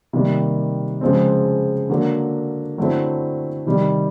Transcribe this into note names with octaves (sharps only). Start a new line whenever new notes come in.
C3 D#3 G3 A#3
C#3 F3 G#3 C4
D3 F#3 A#3
D3 F#3 A3 C4 E4
C3 D#3 G3